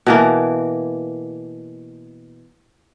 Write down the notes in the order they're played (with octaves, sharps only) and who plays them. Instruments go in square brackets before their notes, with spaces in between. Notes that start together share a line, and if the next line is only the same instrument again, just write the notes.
[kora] B2 E3 A#3